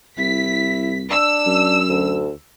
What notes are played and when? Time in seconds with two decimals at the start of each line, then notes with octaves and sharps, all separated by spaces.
0.18 C2 E4 B6
1.10 D4 E6
1.46 F#2
1.89 D2